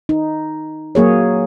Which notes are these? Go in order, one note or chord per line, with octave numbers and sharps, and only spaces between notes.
D#4
F#3 A#3 G#4 C#5